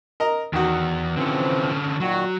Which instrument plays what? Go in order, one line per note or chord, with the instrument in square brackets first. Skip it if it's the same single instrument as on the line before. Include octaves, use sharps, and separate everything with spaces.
[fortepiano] A#4 D#5 A#5
[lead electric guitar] E2 [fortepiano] D#3 F#4
[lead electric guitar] D3 C#4 [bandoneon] E3 F3 C4
[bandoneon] A#2 D#3 F#4 [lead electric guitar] F#3